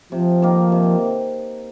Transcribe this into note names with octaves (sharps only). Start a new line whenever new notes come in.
C3 F3
D#3 A#3
C3